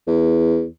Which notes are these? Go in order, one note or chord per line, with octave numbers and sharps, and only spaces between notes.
E2